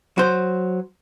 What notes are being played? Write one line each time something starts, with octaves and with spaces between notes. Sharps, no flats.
F#3 C5